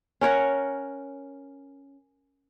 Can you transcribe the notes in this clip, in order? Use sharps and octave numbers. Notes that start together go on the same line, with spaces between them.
C#4 A#4 C#5 F#5